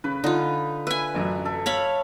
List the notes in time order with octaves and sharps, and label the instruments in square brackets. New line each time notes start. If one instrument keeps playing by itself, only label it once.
[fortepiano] C#3 [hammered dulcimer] B4
[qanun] D3 F4 [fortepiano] D#4
[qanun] B4 G#5 [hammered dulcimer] E5
[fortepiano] A1 F#2
[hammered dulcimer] A4 E5
[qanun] C#5 F5 B5